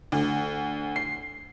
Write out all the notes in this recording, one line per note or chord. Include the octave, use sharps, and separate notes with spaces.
D2
C7